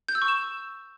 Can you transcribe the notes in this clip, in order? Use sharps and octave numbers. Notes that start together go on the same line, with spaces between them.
G6
E6
C#6
E7